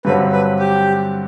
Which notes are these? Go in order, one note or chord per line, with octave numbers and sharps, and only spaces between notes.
G2 D3 F#3 C4 B4
B4
G4